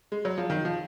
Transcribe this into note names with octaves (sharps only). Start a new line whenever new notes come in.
G#3
F#3
F3
D#3
F3